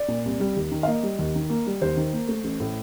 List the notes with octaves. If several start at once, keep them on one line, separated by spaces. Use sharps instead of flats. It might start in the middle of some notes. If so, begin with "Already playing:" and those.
Already playing: D5
A#2
C2
G3
D#2
D#3
F5
A#3 D#5
G3
D#2
D#3
A#3
G3
D#2 C5
D#3
A#3
A3
A1
A2